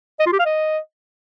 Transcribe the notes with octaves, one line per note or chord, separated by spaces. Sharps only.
D#5
F4
G4
F5
D#5